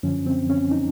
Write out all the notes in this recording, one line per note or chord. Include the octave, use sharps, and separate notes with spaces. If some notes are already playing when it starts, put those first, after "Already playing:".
F#2 D3 F3 C#4
C4
C#4
D#4